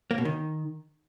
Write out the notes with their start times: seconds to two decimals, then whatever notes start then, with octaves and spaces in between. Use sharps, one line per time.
0.11 A#3
0.18 B2
0.25 D#3